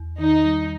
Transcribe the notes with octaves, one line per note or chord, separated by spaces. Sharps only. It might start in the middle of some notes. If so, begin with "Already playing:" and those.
Already playing: E2
D#3 D#4
G3